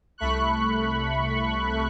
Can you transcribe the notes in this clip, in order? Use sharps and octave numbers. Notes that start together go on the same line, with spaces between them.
C2 A3 B5 C#6 F#6